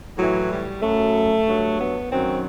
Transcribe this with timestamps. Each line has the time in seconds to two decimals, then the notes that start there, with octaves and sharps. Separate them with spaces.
0.16 A2 E3 F#3
0.50 G3
0.81 F#2 F#3 A3
1.47 G2 F#3
1.79 B3
2.10 F#2 D#3 F#3 C4